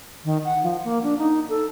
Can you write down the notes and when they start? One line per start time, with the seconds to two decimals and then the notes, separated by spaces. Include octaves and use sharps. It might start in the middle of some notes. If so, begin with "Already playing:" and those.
0.25 D#3
0.45 F#5
0.63 F3
0.84 A#3
1.03 D4
1.18 D#4
1.49 A4